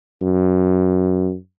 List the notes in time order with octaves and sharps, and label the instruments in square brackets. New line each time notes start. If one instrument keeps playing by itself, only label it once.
[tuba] F#2